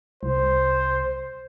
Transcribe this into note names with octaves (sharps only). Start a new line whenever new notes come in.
C2 C5